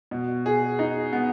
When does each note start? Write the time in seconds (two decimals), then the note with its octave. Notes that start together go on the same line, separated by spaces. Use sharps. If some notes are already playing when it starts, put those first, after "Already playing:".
0.11 B2
0.46 G#4
0.79 D#4
1.13 B3